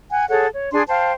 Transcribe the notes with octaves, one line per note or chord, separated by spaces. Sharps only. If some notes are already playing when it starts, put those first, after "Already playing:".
F#5 G#5
G#4 A4 C#5 F#5
C#5
D4 G#4 G#5 C6
C5 F5 G5 A5